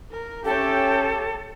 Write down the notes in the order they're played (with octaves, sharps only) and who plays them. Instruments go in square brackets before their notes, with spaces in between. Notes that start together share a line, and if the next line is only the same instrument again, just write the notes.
[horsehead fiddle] A#4
[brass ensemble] C#4 E5 G5 [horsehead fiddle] G4 C#5 [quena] A4